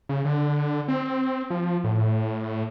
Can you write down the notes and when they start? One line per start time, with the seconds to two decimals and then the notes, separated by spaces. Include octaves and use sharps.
0.09 C#3
0.25 D3
0.88 C4
1.50 F3
1.84 A2